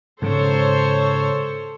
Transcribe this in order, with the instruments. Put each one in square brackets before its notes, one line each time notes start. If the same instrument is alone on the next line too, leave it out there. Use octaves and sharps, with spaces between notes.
[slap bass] G#2 C#3 [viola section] A4 C5 C#5